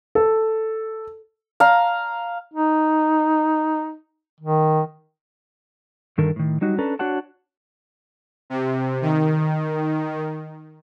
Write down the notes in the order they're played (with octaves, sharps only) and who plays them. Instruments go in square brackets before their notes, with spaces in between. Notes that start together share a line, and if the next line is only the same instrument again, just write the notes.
[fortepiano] A4
[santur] F5 A#5
[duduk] D#4
D#3
[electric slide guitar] G2 D3 D#3 A4 A#4
A2 D#3
F#3 G3 D#4 F#4
C#4 D4 A4 B4 A#5
D4 F#4 C#5 F#5 A5
[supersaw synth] C3
D#3